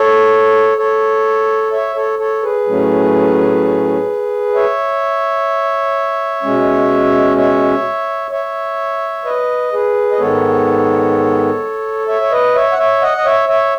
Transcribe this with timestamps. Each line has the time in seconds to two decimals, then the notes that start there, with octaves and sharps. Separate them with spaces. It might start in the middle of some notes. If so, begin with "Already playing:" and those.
Already playing: A4 C#5
0.78 A4 C#5
1.72 C#5 E5
1.95 A4 C#5
2.19 A4 C#5
2.43 G#4 B4
2.67 A2 F#3 A3 C#4
4.55 C#5 E5
6.43 B2 G#3 C#4
7.37 C#5 E5
8.31 C#5 E5
9.25 B4 D#5
9.73 G#4 B4
10.12 D#5
10.19 G#2 D#3 G#3 B3 A4 C#5
12.08 C#5 E5
12.22 C#5
12.31 B4 D#5
12.55 C#5 E5
12.72 F#5
12.78 C#5 E5
13.02 D#5 F#5
13.17 D#5
13.25 C#5 E5
13.49 C#5 E5